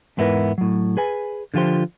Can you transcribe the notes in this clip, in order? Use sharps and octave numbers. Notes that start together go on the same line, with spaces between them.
E2 G#2 B3 E4 A#4 B4
A2 F#3
G#4 B4 G#5
D3 F3 F4 G4 C5